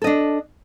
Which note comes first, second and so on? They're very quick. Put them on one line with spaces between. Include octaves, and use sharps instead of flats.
A4 D#5 D4